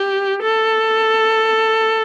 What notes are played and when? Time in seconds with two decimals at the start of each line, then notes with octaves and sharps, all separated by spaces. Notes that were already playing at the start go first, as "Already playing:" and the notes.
Already playing: G4
0.43 A4